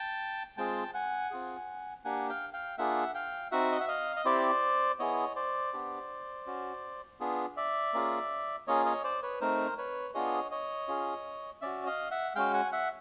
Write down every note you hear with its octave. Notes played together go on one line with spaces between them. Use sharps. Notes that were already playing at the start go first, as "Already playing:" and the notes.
Already playing: G5 A5
G#3 C4 F4 G#4 G5 A5
F#5 G#5
C4 F4 G#4
A#3 D4 G4 F#5 G#5
F5 G5
F5 G5
A#3 D4 F4 G#4 E5 F#5
F5 G5
C4 D#4 F#4 E5 F#5
D#5
E5
D#5 F5
D#5
C4 E4 G4 C5 D5
B3 E4 G#4 C#5 D#5
C5 D5
B3 D4 G4
C#4 F#4
B3 D4 F4 G#4
D5 E5
A#3 C#4 F4 G#4
A#3 C#4 F4 G#4 C#5 D#5
C#5 D#5
C5 D5
B4 C#5
A3 C4 D#4 A#4 C5
B4 C#5
B3 D4 F4 G#4 C#5 D#5
C#5 D#5
C#4 F4 G#4
C#4 F#4 D5 E5
D#5 F5
E5 F#5
G#3 C#4 F#4 F5 G5
F#5 G#5
E5 F#5